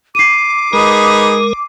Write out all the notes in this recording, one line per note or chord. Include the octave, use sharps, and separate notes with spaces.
D6 C7 D#7
G#3 D#4 G#4 A#4 B4